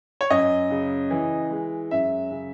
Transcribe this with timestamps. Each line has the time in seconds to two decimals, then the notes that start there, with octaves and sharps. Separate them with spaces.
0.21 C#5
0.30 F#2 D#5
0.71 C#3
1.10 E3
1.51 G#3
1.91 F#2 E5
2.31 C#3